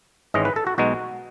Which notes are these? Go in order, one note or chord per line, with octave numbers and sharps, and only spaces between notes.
G#1 G#2 E3 G#3 C#4 D#5
B4
A4
F#4
B1 B2 G#3 D#4 F#4